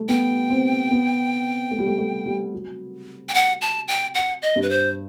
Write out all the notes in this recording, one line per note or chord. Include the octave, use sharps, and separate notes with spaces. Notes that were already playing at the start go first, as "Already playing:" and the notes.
Already playing: G3 A3
B3 G5
C4
B3
A3
G3
A3
A3
G3
F#3
G5
F#5
A5
G5
F#5
D#5
G2
B4
C5